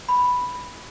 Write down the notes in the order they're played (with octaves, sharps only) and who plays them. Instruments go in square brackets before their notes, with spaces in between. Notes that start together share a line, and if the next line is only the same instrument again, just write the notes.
[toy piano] B5